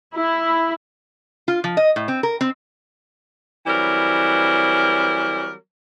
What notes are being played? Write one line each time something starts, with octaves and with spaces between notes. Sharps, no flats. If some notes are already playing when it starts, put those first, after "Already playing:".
E4
F4
F3
D#5
A2
C4
A#4
C4
E3 F#3 G3 C4 A#4